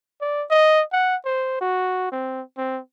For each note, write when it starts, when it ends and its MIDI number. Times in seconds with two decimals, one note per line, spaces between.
0.21 0.45 74
0.50 0.82 75
0.92 1.16 78
1.25 1.59 72
1.61 2.10 66
2.12 2.41 60
2.58 2.79 60